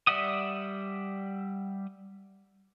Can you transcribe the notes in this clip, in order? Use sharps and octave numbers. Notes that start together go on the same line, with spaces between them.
G3 D5 E5 F#5 D#6